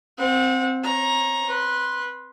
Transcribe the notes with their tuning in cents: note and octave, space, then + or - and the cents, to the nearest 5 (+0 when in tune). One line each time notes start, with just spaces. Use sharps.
C4 +0 F#5 -35
C#5 -30 A#5 +15
B4 -10 C6 +5